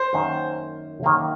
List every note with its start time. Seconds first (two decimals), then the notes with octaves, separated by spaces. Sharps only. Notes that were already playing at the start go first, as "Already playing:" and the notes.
Already playing: C5
0.13 F#2 D#3 A#3 C#4
1.03 F#2 D#3 A#3 C#4